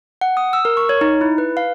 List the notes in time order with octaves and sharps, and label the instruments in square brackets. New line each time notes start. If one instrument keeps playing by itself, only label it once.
[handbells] F#5
D#6
E6
A#4
C#6
C#5
D#4
E4
B4
F5